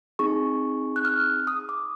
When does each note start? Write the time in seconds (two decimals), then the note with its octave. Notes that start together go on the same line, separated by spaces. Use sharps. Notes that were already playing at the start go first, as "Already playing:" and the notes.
0.19 C4 D#4 G#4 C#6
0.96 F#6
1.05 F6
1.47 D#6
1.69 D6